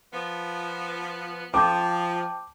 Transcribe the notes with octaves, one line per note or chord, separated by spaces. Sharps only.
F3 B3
F3 G5 A5 D6 G6